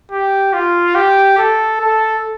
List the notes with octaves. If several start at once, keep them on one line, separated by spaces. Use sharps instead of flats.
G4
F4
G4
A4
A4